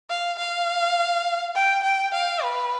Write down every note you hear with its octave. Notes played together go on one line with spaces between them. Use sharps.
F5
F5
G5
G5
F5
B4